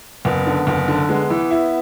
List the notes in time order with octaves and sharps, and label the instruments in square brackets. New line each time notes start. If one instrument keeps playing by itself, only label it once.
[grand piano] F#1 [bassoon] B3
[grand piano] D3
F#1
D3
[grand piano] G#3 [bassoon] B3
[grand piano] E3
E4